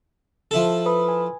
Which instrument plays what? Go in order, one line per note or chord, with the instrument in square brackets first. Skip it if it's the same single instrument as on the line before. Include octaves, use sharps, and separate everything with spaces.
[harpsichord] F3 E4 A4
[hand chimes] B4 B5 D#6
G#5